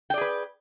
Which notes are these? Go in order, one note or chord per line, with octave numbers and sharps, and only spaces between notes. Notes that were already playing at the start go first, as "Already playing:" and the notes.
G#4 B4 D5 G5